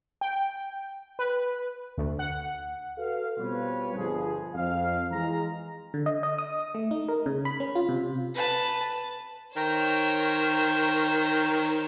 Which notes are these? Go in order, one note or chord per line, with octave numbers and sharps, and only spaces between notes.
G5
B4
D2
F#5
F#4 A4 B4 F5
B2 G3 C4 F4 B4 C#5
G1 F3 G#4
F2 F5
E3 G#3 A#5
D3
D#5
D#5
D#6
A3
D#4
A#4
C#3
B5
C#4
F4
C3
B4 A5
D#3 C5 C#5 G5 A#5